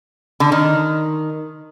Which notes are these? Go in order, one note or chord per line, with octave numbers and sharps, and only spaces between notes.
D3
D#3